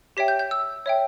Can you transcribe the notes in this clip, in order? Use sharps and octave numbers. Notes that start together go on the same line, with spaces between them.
G4 C#5 E5 G5 B6
G6
G6
E6
C#5 E5 G5